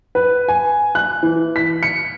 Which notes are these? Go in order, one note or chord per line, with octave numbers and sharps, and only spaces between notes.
B4
G#5
F#6
E3
B6
C#7